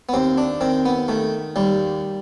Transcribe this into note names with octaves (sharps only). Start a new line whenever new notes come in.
B3
D#2 C4
D4
D#3 C4
B3
D#3 A3
D#2 G3